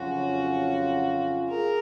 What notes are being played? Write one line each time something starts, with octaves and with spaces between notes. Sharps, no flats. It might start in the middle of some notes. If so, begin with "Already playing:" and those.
Already playing: F2 C#3 F#3 C#4 F4 F#4
G#4 A#4